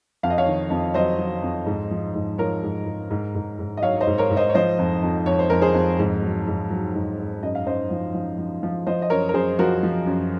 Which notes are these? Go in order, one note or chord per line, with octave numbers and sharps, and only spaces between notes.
F2 F5
D#5
C#5 F5
D#3
F2
F#3 C5 D#5
F#3
F2
G#2
F3
G#2
F3 A#4 C#5
G#2
G#2
G#2
G#2
G#2
D#5
F#3 C#5 F5
C#5
C5 D#5
G#2
A#4 C#5
G#2
C5 D#5
C#5
F3 C5 D#5
F2
F2
F2 C#5
C5
F2 A#4
G#4 C5
F2
G#2
F#3
G#2
F#3
G#2
G#2
F#2 D#5
F5
F#2 C5 D#5
F3
F3
F3
F3
F3 C5 D#5
D#5
F#2 A#4 C#5
A#4
F#2 G#4 C5
F3 F#4 A#4
F3
F#2